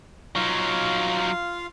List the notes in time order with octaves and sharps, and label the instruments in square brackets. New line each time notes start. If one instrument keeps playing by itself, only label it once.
[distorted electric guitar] F#3 D#4 [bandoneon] F4 F5